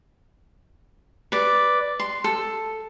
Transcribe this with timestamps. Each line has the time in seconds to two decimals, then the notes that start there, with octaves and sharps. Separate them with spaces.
1.32 B4 D5
2.00 C6
2.24 A4